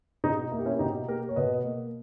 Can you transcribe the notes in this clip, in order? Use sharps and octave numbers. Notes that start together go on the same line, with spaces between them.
B2 D#4
A#3 E4
G4
C#4 E4
B2 D#4 G4
A#3 G4 A#4
C#5
B2 B4 D#5
A#3